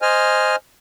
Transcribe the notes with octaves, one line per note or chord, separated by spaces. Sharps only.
C5 D#5 G#5 F6